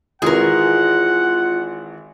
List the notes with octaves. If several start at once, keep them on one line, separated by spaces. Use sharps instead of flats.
G#1 E3 F4 F#4 G#4 A#4 F#5